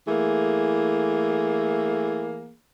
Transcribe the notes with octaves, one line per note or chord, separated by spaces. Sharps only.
E3 A3 A#3 G#4